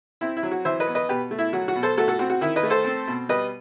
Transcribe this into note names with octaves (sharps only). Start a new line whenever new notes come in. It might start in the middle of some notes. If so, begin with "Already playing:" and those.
C4 E4
E4
F#3
F#4
E3 C5 E5
B4 D#5
B3
B4 D#5
B2 G4 B4
A3
E4
F#3 F#4
F#4
B2
A4 C5
A3 F#4 A4
F#4 A4
C4 F#4
F#4
D#3 E4
B4 D#5
A3
A4 C5
C4
B2
G3 B4 D#5